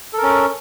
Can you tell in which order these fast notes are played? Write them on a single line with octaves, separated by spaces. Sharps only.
A4 A#4 C#4